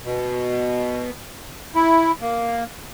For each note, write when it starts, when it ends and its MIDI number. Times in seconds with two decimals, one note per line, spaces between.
0.04 1.11 47
1.75 2.11 64
2.21 2.64 58